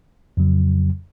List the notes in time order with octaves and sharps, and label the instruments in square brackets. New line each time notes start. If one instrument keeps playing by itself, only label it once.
[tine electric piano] F2 C#3 F#3